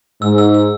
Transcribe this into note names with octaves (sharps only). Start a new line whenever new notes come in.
G#2 E6
E6
E6